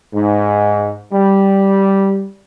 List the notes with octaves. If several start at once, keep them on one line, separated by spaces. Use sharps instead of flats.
G#2
G3